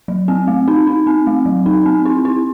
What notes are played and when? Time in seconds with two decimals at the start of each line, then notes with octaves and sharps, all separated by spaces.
0.08 F#3
0.28 C4
0.47 A3
0.68 D#4
0.87 D#4
1.07 C4
1.27 A3
1.46 F#3
1.66 D#4
1.85 C4
2.05 E4
2.25 E4